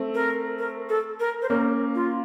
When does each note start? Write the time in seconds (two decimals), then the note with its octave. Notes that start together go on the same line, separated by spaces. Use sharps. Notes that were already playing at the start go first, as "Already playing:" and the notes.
Already playing: A3 C4
0.15 A#4
0.59 A#4
0.89 A4
1.20 A#4
1.42 C5
1.49 A#3 C#4 A#4
1.95 F4